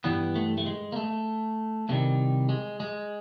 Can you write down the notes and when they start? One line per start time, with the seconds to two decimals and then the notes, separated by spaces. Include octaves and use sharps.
0.04 G2 E3 G3 B3
0.36 A3
0.58 A3
0.66 G#3
0.92 A#3
0.96 A3
1.89 C2 C3 D#3 G3 A3
2.49 G#3
2.80 G#3